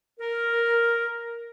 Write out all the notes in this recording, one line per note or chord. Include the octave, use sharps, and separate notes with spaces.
A#4